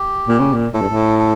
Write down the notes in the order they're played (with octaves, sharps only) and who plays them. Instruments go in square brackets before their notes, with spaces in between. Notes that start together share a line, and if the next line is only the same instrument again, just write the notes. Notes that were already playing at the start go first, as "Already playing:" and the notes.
Already playing: [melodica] G4
[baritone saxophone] A#2
C#3
A#2
[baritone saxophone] A2 [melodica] A4
[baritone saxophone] G2
A2
[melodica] A4